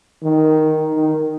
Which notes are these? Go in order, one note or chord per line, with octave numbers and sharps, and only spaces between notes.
D#3
D#3